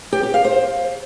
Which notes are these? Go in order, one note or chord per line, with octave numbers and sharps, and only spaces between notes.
G4
G4
F5
C5